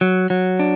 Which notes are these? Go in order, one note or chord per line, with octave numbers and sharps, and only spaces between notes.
F#3
F#3
D4